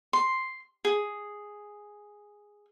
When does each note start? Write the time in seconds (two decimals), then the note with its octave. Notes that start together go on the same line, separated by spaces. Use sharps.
0.13 C6
0.85 G#4